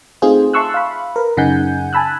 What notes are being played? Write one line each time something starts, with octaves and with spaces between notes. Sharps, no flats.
A3 C4 D#4 F4 G#4 C5
E5 A5 C6 C#6 E6 F#6
F5 B5
A#4 B4
F#2 C#3 D#4 F#5 G#5 G6
G#5 A5 B5 E6 F#6